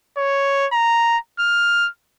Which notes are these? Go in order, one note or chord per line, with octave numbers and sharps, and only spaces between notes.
C#5
A#5
F6